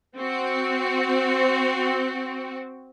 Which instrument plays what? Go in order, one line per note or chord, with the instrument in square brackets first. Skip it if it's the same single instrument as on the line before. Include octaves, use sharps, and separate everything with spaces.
[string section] C4 F#4